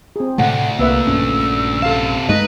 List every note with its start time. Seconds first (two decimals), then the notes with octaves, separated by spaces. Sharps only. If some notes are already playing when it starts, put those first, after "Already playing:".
0.16 C4 G#4
0.38 D2 A2 C3 A3 F#5
0.79 C2 A#3 B4 E5 E6
1.07 A#1 G2 C#4
1.83 C3 A4 F5 A5
2.29 G2 G#3 A3 D#4 B4 D#5